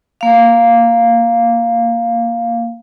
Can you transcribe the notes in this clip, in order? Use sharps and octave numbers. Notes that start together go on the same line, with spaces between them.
A#3 F5